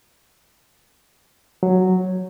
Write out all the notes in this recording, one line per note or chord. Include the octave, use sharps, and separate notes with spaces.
F#3